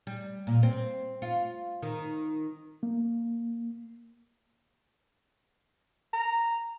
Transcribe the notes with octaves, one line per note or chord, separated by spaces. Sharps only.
G3
A#2
C4
F4
D#3
A#3
A#5